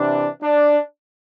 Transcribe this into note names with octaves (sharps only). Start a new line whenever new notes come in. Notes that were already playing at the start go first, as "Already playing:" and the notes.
Already playing: C3 E3 D4
D4